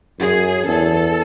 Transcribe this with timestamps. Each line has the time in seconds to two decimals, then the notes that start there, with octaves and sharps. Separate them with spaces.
0.20 F#2 G#4
0.67 E2 A4